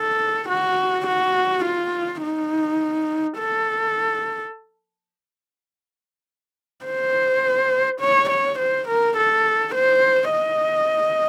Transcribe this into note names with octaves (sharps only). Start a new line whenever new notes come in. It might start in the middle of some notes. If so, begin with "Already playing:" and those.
Already playing: A4
F#4
F#4
F4
D#4
A4
C5
C#5
C#5
C5
A#4
A4
C5
D#5